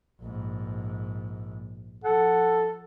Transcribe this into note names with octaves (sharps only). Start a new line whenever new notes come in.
A#1 G#2
F3 A4 F#5